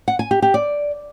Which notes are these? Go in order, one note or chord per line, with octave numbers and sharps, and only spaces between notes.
F#5
G#5
G4
G4
D5